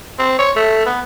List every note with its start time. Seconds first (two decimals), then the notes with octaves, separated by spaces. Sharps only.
0.19 C4
0.39 C#5
0.56 A3
0.86 B3